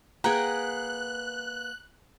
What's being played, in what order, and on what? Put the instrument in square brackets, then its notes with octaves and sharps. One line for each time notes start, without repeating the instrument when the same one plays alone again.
[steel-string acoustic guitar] A#3 B4 F#5 [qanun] G#4 G5 [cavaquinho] A#5 [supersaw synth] F#6